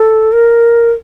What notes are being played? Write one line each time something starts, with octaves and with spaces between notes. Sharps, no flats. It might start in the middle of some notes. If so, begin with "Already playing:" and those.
Already playing: A4
A#4